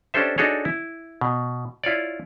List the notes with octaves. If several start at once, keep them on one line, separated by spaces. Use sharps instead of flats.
C#4 D4 G4 A4 C5 E5
D4 D#4 F#4 G#4 A4 C#5
E4
B2
E4 F4 C#5 D5